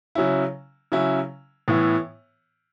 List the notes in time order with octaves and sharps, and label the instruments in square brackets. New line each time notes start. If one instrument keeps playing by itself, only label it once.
[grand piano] C#3 F#3 C#4 E4
C#3 F#3 C#4 E4
A2 E3 B3 E4